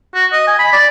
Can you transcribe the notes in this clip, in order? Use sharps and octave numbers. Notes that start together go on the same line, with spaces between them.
F#4
D#5
G#5
B5
D5